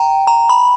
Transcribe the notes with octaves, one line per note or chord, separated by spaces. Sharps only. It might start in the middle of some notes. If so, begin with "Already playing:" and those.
Already playing: G5 A#5
A#5
B5